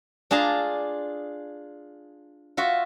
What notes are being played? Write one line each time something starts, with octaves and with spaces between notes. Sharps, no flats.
D4 F4 G#4 A5 A#5
F4 F#4 E5